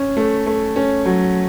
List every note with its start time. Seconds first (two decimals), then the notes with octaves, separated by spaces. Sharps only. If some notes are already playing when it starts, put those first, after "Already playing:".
Already playing: C#4
0.17 A3
0.46 A3
0.76 C#4
1.06 F#3